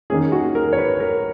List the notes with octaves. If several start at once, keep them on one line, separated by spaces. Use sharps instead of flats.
D#3 A#3 C#4 G#4
F#4
A#4
C#5
B4
A#4